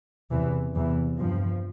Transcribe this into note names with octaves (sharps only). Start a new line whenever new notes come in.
E2 C3 E3
E2 C3 E3
G2 F3